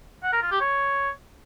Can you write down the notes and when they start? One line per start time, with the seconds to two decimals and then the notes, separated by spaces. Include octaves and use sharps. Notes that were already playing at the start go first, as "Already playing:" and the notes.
0.23 F#5
0.32 A#4
0.42 F4
0.51 G4
0.60 C#5